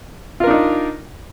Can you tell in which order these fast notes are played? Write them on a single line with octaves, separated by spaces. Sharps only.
F4 A#4 D4 D#4